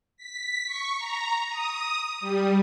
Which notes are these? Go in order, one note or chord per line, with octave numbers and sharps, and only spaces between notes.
B6
C#6
A#5
D#6
G3